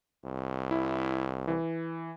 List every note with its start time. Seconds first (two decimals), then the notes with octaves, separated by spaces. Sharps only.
0.25 C2
0.71 E4
1.48 E3